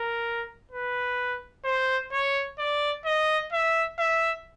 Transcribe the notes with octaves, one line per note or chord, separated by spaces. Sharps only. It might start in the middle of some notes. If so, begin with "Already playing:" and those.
Already playing: A#4
B4
C5
C#5
D5
D#5
E5
E5